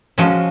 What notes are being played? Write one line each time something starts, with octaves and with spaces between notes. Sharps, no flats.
F3 G#3 C#4 F#4